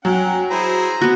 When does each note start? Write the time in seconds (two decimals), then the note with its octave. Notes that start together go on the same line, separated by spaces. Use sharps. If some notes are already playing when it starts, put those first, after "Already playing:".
0.05 F#3 C#4 F#5 G5
0.51 E4 G#4 C5 A#5
1.01 B3 F#4